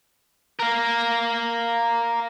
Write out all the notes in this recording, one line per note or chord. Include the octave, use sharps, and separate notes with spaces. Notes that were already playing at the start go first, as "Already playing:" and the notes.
A#4 F5